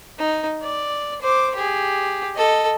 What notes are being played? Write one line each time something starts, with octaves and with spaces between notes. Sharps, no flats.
D#4
D5
C5 D6
G4 G#4
A4 D#5